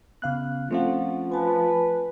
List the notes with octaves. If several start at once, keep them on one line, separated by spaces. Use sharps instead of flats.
C#3 B3 F5 F#6
F3 A3 C4 C#4 F4 F5 F#5
B4 G#5 A5